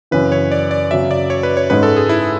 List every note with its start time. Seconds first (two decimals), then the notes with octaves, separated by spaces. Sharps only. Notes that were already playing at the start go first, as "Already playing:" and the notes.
0.11 F#2 C#3 E3 B4
0.32 C#5
0.52 D5
0.71 D5
0.91 F#2 C#3 F#3 E5
1.11 D5
1.30 C#5
1.43 B4
1.57 C#5
1.70 G#2 G#3 C#4 B4
1.83 A4
1.96 G#4
2.09 E4